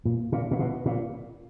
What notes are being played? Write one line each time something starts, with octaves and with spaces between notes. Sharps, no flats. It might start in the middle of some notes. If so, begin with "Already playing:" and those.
A#2
A#2
A#2
B2
A#2